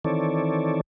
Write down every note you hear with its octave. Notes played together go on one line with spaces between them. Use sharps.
D#3 E3 C4 A4 C#5 D5